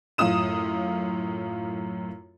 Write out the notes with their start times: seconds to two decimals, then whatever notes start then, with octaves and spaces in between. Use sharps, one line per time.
0.18 F#2 A2 F4 D#6 E7